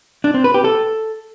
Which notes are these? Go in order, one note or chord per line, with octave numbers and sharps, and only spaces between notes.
D4
C4
B4
G4
A4